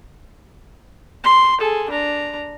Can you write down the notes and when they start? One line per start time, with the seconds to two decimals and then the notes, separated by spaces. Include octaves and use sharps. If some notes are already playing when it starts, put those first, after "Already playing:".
1.24 C6
1.60 G#4 A4
1.90 D4 A#5